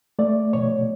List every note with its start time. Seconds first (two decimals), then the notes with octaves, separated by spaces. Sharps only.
0.19 A3 D5
0.53 B2 C#5